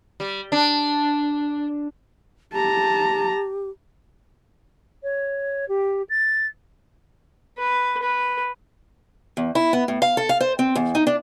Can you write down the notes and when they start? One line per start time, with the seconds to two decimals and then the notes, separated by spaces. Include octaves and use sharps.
0.20 G3
0.52 D4
2.53 G4 A5 A#5
5.03 C#5
5.68 G4
6.09 A6
7.58 B4
8.02 B4
9.37 E2
9.55 E4
9.73 B3
9.88 A2
10.02 F5
10.17 A4
10.29 F5
10.40 C5
10.59 C4
10.76 E2
10.95 D#4
11.07 D4